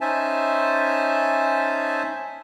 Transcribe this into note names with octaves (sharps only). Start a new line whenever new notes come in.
C#4 D#4 C5 E5 G#5 A5